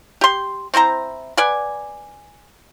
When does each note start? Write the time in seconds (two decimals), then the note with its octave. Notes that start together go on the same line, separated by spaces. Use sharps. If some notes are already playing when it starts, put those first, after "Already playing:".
0.21 G4 C6
0.74 C4 E4 C5 A#5
1.37 B4 D5 F#5 G#5